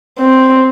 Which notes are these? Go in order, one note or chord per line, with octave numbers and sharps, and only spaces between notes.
C4